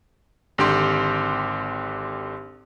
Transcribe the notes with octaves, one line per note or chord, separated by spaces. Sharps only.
G#1 D3 G4 G5 C6